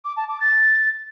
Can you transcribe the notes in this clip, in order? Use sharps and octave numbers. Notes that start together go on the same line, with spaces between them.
D6
A5
D6
A6